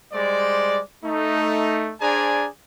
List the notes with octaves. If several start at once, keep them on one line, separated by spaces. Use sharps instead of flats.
G3 G#3 C5 D5
A3 D#4
D4 G#4 C5 D5 G#5 A#5